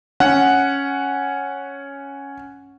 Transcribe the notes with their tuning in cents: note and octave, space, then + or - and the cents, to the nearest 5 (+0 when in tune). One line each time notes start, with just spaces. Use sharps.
C#4 +0 F#5 +0